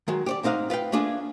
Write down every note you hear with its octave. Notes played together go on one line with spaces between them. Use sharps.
D#3 F#3 G#3
G4 C#5 D5
G#2 C4 D#4 F5 F#5
F4 B4 F5 G5
A3 A#3 D4 F4 G#4